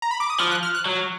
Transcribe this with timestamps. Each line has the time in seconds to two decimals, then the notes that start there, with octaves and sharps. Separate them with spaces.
0.02 A#5
0.11 B5
0.20 D6
0.30 D#6
0.40 F3 F6
0.51 F#6
0.63 F6
0.75 F#6
0.86 F#3